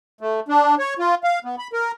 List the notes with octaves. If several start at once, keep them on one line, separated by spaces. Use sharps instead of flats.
A3
D4
C#5
F4
F5
B3
B5
A#4